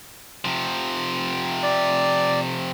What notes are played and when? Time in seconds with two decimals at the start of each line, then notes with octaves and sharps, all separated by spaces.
0.45 C3 F3
1.63 D5